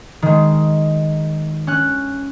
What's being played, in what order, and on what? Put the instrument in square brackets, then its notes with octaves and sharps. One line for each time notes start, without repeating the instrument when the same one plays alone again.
[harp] D#3 G#3
C#4 F#6